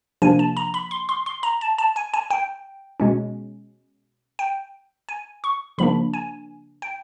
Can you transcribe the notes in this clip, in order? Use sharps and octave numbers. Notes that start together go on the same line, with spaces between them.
C3 F3 A#3 D4 G#5
A5
A#5
B5
C6
C6
C6
A#5
A5
A5
G#5
G#5
G5
B2 G#3 C#4
G5
G#5
C#6
C#3 F3 A#3 D4 B5
G#5
G5